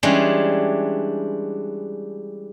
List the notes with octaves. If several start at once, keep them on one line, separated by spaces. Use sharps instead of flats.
E3 G3 G#3 C#4 D4